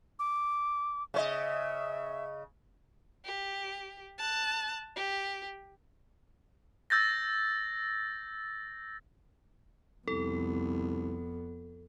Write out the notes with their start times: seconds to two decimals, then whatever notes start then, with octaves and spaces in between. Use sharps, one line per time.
0.19 D6
1.14 C#3 C5 D#5 E5
3.25 G4
4.18 A5 F#6
4.96 G4
6.90 E6 G6 A6 A#6
10.08 C2 F2 B3 A4